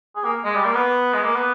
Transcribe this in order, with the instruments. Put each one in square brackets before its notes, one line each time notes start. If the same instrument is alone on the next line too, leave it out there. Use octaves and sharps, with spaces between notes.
[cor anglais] G#4
A#3
G#3
G3
A#3
B3
G#3
A#3
B3